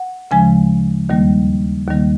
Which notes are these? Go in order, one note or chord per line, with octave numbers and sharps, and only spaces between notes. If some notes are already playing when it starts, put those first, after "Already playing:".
Already playing: F#5
D2 C#3 F3 G#3 G#5
D#2 D#3 G3 A#3
D#2 D#3 G3 A#3